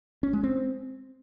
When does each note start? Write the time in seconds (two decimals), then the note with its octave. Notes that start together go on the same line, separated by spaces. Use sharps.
0.23 C#4
0.33 G#3
0.43 C4